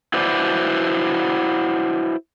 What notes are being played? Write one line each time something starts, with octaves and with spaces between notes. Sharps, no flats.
E4 F#4 B4 C5 D5